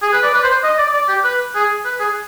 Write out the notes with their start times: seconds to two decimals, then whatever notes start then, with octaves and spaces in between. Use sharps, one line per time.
0.02 G#4
0.13 B4
0.23 D5
0.34 B4
0.44 C5
0.63 D#5
0.78 D5
0.93 D5
1.09 G4
1.24 B4
1.55 G#4
1.85 B4
2.00 G#4